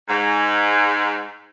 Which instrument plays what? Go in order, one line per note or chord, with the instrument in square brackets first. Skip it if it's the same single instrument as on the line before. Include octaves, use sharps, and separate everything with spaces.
[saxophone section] G#2